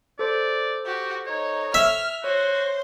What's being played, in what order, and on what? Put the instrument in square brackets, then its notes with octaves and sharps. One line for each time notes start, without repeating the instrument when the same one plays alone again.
[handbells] A4 C5 [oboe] D5
[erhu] F#4 [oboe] G4
[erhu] D#4 [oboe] C#5
[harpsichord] E5 [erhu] F6
[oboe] F#4 [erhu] C5 [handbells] C#5